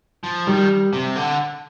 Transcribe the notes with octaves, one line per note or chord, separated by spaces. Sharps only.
F3
D#3 G3
C3
D3